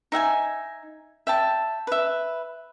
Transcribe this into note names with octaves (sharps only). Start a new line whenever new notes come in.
D#4 E5 F#5 G#5
E5 G5 A5
B4 E5